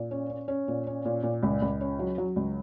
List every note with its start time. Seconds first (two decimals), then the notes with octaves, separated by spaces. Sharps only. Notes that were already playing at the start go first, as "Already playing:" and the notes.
Already playing: A#2
0.11 C#4
0.30 C#4
0.48 C#4
0.68 A#2
0.87 C#4
1.05 A#2
1.23 A#2
1.43 C#2
1.62 C#2
1.81 C#4
1.99 F#3
2.18 F#3
2.36 C#2